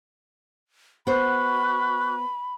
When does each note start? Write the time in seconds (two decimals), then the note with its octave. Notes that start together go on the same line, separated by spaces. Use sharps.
1.07 B3 F#4 C5 B5 C#6 F#6